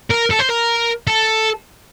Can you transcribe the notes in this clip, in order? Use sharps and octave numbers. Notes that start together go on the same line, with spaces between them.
A#4
A4
C5
A#4
A4